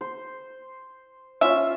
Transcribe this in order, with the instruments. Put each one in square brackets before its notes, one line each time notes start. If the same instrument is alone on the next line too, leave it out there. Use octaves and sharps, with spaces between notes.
[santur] C5
[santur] C#4 F4 [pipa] E5